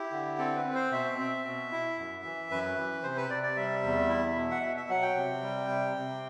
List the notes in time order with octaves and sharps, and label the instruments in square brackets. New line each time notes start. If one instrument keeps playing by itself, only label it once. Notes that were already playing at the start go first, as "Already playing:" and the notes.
Already playing: [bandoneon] E4 G4
D3
C4 A4
B4
C4
C5
B2 E5
C4
B2
E4
F#2
E3
F#2 B4
E3
C3 C5
B4
C3 D5
D5
G3 E5
E2
E4
B2
F#5
B2 E5
E5
F#3 F#5
G5
C3
G3
C3
C3